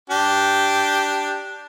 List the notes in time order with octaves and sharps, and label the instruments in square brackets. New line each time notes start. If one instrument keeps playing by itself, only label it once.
[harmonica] D4 G4